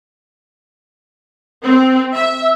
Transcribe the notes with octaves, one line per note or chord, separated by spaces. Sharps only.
C4
E5